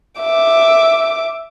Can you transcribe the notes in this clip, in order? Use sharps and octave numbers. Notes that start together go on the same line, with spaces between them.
E5 D6